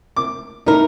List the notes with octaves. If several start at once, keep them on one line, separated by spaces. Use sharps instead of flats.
D6
A3 D#4 E4 A#4